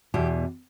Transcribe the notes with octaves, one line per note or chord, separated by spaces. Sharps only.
E2 B2 G4